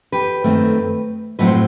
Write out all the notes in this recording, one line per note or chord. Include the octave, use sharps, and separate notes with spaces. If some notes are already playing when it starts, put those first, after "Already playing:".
G4 B4
F#2 D#3 A3 C4
A2 F#3 C4 B4
C5